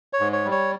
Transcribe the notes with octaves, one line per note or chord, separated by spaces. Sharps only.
C#5
G#2
C#5
G3
C#5